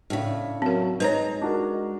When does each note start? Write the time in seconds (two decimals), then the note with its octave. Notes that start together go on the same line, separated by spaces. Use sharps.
0.10 A2 C#3 D4
0.62 F#3 C4 A#4
1.00 G#3 D#4 B4 C#5 A#5
1.42 D4 F#4 A#4